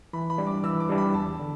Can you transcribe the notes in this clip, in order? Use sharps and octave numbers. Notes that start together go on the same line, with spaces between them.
E3 B5
B5
G3 D4
D6
E3 E6
D6
G3 D4
B5
E2 A5
D3